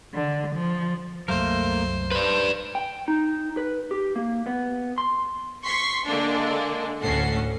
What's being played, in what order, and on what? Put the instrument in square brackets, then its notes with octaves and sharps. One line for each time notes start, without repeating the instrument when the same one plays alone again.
[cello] D3
F3
[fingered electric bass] C2 F#2 F#3 [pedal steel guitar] A3 A#3 A#4 [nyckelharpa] C5
[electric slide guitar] B4 D5 [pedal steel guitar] C5
[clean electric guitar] G5
D#4
B4
G4
A#3
B3
C6
[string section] C6 C#6 B6 C7
D3 G#3 A#3 D4
D2 A2 C#4 A4 F#5 C7